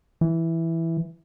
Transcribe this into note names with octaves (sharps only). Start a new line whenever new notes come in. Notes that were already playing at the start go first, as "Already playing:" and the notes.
E3